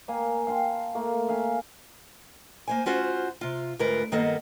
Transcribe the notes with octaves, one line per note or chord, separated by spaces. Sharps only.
A#3 F5 G#5 A#5
F5 G5 A5 C6
A3 A#3
E5 F5 G#5 A#5
A#3 C5 G#5
C#4 F4 F#4 C5
C3 F4
D2 G#2 F4 A#4 B4
G2 D#3 A#3 B3 A4 D#5